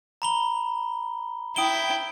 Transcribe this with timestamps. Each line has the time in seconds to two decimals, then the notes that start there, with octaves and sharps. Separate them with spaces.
0.22 A#5 B5 G7
1.56 E4 G5 D#6 D7 G7